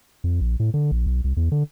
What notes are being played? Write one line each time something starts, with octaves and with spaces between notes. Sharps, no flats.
F2
A#1
A2
D3
A#1
B1
C2
E2
D3